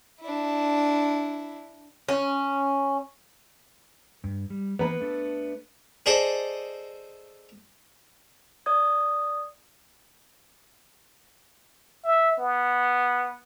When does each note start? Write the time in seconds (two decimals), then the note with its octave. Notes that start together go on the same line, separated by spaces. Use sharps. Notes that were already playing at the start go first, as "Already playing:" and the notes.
0.21 D4 E4
2.09 C#4
4.24 G2
4.50 G3
4.79 E3 A#3 B3 B4
5.01 A3 D4 A4
6.06 G#4 A4 C5 D5 D#5
8.66 D5 D#6 G#6
12.04 E5
12.38 B3